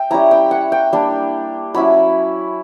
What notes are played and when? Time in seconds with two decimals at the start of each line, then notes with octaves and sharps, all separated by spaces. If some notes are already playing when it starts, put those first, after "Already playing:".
Already playing: E5 G5
0.11 G3 C#4 E4 A#5
0.31 G5
0.51 F#5
0.72 G5
0.93 G3 A#3 D4
1.74 F#3 C#4 E4 B5